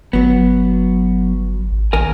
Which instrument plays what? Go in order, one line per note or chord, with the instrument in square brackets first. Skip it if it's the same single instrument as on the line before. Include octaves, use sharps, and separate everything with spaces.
[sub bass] G1 [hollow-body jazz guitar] F#3 B3
[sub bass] G#1
[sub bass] A#1 [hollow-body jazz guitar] D#2 A#4 G#5